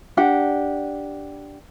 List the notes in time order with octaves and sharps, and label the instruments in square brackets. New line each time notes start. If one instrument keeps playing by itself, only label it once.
[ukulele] D4 G4 F#5